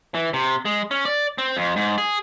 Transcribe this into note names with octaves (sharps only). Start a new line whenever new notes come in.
E3
C3
G#3
C#4
D5
C4
F2
G#2
G#4